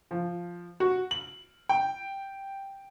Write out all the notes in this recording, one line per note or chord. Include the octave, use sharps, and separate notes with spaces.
F3
F#4
F#7
G5